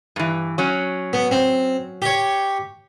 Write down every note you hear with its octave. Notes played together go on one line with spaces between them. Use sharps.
G2 E3
F#3 C#4
B3
C4
G4 C#5